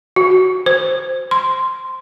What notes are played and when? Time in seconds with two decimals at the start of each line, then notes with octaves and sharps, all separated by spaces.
0.16 F#4
0.66 C5
1.31 C6